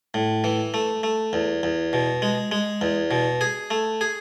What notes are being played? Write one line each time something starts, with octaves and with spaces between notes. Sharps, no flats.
A2
E3
A3
A3
E2
E2
B2
G#3
G#3
E2
B2
G#4
A3
G#4